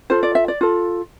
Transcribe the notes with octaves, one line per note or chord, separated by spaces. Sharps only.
F4 A4 C5
D5
E5
D5
F4 A4